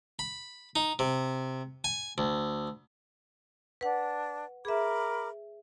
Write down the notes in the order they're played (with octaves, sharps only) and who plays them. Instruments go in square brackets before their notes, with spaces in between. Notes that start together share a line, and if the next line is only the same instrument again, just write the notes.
[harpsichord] B5
D#4
C3
G#5
D2
[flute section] D4 [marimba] B4 F#5
[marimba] G#4 E5 [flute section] A#4 B5 D6